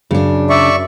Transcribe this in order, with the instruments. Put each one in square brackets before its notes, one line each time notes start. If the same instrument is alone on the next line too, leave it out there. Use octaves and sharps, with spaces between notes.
[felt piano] F#2 [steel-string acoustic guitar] C#3 D4
[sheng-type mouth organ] D5 E5 C#6